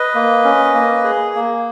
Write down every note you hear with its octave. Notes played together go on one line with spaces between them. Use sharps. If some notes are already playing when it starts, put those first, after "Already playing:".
Already playing: B4 D#5
A#3
C#4
A#3
G#4
A#3